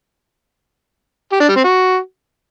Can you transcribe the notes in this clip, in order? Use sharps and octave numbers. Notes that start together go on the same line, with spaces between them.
G4
D4
G3
C4
F#4